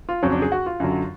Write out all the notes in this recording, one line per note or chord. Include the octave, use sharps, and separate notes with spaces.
F4
F2 C#3 F#3 C#4
D4
G#4
F#4
F4
F#2 D3 F#3